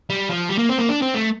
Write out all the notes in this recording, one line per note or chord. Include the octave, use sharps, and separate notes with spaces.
G3
F3
G3
A#3
C4
A#3
D4
C4
A3